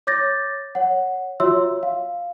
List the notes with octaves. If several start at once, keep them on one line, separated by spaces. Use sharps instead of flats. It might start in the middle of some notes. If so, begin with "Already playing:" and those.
C#5 D6 G6 A6 A#6
C#5 F#5
F4 F#4 C#5 E5 C6 E6
F5